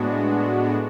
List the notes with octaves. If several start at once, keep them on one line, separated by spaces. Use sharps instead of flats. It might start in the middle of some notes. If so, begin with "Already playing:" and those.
Already playing: A2 G#3 B3 D4 F#4